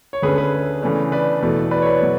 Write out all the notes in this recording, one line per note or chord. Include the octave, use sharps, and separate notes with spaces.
C#5
D2 D3 A3 C#4 G#4 B4
G#4 B4
C#3 E3 A3 D4
B4 D5
E2 B2 A3
B4 D5
C#5
B4 D5
B2 F#3